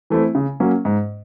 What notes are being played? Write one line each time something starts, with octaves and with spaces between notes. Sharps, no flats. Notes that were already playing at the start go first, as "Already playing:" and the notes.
E3 A3 C4 E4
C#3
F#3 A#3 C#4
G#2